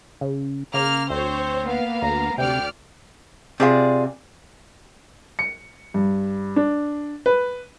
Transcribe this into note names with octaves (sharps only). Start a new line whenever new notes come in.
C#3
C#3 A#3 F6
D2 C4 C5 C#5
A#3 B3 F5
D2 A#5
D2 C3 D5 G5 F6
C3 F4 G#4 D5
C#7
G2
D4
B4